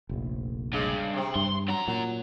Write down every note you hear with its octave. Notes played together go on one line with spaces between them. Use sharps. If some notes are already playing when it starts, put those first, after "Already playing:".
F1 A#1
G2 C#3 G#3
C3 C4
G2 C6
F#2 F#3 A#5
A#2 F#3